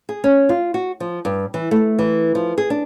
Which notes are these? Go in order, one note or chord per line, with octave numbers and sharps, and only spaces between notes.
G#4
C#4
F4
F#4
F3
G2
E3
A3
E3
F3
G#4
D4